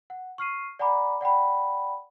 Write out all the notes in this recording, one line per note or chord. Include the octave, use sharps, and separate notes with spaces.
F#5
C#6 F6 C7 D#7
D5 F#5 G#5 A#5 B5 D6
D5 F#5 G5 B5